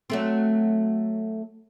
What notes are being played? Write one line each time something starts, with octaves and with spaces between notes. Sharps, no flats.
F#3 A3 C4